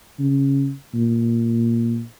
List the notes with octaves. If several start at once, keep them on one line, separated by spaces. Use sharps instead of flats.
C#3
A#2